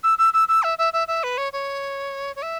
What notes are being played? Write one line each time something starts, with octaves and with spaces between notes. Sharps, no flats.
E6
E6
E6
E6
E5
E5
E5
E5
B4
C#5
C#5
C#5
E5